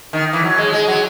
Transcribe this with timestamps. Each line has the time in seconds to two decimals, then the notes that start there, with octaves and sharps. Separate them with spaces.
0.13 D#3
0.33 E3
0.43 F#3
0.58 G#3
0.73 G#3
0.88 F#3